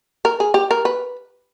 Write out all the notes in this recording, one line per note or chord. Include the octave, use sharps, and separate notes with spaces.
A#4
G#4
G4
A#4
B4